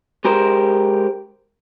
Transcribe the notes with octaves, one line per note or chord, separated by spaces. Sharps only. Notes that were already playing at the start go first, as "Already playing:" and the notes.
G#3 G4 A#4 C5